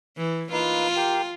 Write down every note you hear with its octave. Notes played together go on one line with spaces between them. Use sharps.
E3
A#3 D#4 F4 B4
G4 A#4 G5